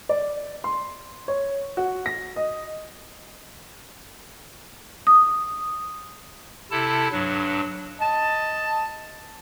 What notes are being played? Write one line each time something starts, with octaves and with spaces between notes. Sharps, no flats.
D5
C6
C#5
F#4
A#6
D#5
D#6
C3 E4 A4 A5
G2 F#3 D4
D#5 A5